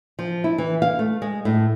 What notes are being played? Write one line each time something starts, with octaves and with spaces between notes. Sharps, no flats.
F3
E4
E3
F5
A3
G#3
A2